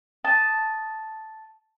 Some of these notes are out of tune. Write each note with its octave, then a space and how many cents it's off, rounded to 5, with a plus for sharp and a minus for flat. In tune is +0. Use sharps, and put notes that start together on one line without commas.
A5 -5 D#6 +0